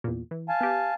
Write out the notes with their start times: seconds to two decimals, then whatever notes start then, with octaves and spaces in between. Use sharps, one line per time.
0.04 E2 A#2
0.31 E3
0.49 F5 G#5 A5
0.61 B3 G4